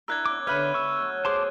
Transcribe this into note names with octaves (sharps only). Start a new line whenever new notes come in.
D4 E4 A#4 E6 F#6 G#6
B3 C#4 D6
D3 B4 C#5 E5 B5 F6 F#6 D#7
C#6 E6
B2 F#3 A3
G#4 C5 A5 C6 D6